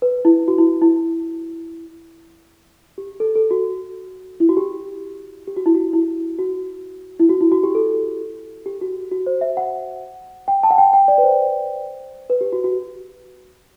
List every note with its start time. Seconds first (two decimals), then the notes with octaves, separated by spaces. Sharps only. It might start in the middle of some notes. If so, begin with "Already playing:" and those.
0.02 B4
0.25 E4
0.48 F#4
0.58 E4
0.81 E4
2.98 G4
3.20 A4
3.36 A4
3.51 F#4
4.40 E4
4.49 F#4
4.57 G4
5.47 G4
5.57 F#4
5.66 E4
5.75 F#4
5.93 E4
6.39 F#4
7.20 E4
7.29 F#4
7.41 E4
7.52 F#4
7.64 G4
7.75 A4
8.66 G4
8.81 F#4
9.11 F#4
9.26 C5
9.41 E5
9.57 F#5
10.48 G5
10.63 A5
10.71 F#5
10.78 G5
10.93 G5
11.08 D5
11.18 B4
11.23 C5
12.30 B4
12.41 G4
12.53 F#4
12.64 F#4